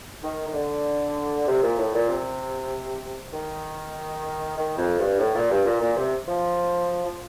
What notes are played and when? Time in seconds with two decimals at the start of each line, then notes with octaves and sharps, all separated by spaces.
0.23 D#3
0.47 D#3
0.54 D3
1.47 C3
1.63 A#2
1.78 A2
1.94 A#2
2.09 C3
3.33 D#3
4.57 D#3
4.77 F2
4.99 G2
5.19 A2
5.35 A#2
5.51 G2
5.65 A#2
5.81 A#2
5.97 C3
6.28 F3
7.05 F3